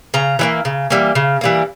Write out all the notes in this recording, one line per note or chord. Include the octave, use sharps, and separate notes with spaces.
C#3 A#5
E3 G3 A#3
C#3
E3 G3 A#3
C#3
E3 G3 A#3